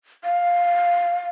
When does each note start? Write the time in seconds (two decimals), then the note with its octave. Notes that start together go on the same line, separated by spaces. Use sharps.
0.24 F5